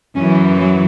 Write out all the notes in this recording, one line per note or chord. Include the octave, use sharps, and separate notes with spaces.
F#2 E3 C#4
F#3